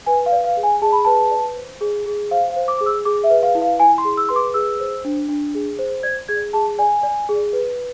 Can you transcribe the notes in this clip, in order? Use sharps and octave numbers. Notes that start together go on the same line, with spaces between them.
B4 G#5
F5
D5
F5
G#4
G#5
G#4 A5
B5
B4 A5
D5
C5
G#4
G#4
C5 F5
F5
C5
D6
G#4 D6
E6
G#4 D6
E5
B4
F5
E4
F5
E4 G#5
C6
G#4
E6
B4 C6
D6
G#4 E6
C5
D4
D4
G#4
C5
D5 G#6
G#4 G#6
G#4 A5
D5 G#5
D5
G#4
B4